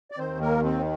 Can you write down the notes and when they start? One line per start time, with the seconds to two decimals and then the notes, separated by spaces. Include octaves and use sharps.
0.11 D5
0.18 D#2 D#3 C4 C5
0.41 A#3 A#4
0.64 C4